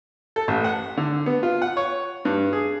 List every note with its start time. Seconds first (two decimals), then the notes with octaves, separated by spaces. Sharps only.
0.36 A4
0.48 A1
0.64 F#5
0.97 D3
1.26 B3
1.43 F4
1.62 F#5
1.77 C#5
2.25 G2
2.53 G#4